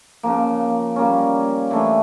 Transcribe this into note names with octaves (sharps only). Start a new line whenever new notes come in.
C#3 F3 A#3
G3 A#3 C#4
E3 A3 D4